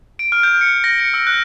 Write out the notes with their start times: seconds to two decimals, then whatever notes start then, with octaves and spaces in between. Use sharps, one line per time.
0.19 D7
0.32 F6
0.43 G6
0.61 C#7
0.84 A#6
1.00 C#7
1.14 E6
1.27 F#6